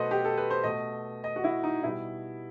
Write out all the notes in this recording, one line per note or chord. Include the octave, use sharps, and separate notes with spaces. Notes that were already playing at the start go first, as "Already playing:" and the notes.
Already playing: B2 F#3 A3 A4 B4 C5 D#5
G4
A4
B4
C5
B2 A3 D#5
D#5
F#4
E4
D#4
B2 G3 E4